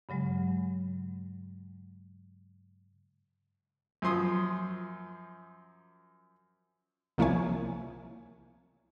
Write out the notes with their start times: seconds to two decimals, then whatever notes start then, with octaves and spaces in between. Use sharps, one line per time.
0.09 G2 C#3 F#3 G#3
4.02 F#2 F3 C6 D#6
7.18 C2 F3 A#3 E4 C#5 G#5